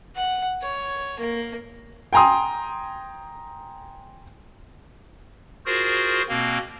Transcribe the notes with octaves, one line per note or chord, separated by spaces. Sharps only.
F#5
C#5
A#3
G5 G#5 A#5 C6 D#6
F4 F#4 G#4 A#4 C5
B2 A#3 C4